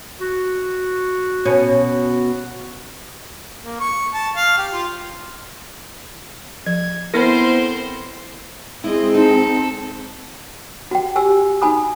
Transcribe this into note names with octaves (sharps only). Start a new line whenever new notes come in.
F#4
B2 C#4
A#3
C#6
A5
F5
G4
F4
F3 G#6
B3 C4 E4 A4 A#4 C5
G#3 C4 E4 D#5
D#4 A4
F#4 G5
F#4 G4 G#5 E6
D#4 F#4 G#5 B5 D#6